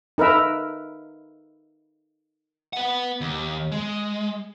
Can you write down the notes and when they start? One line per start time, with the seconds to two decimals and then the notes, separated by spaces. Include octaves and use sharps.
0.18 D#4 A#4 B4 E5
2.73 B4 F#5
3.21 D#2
3.72 G#3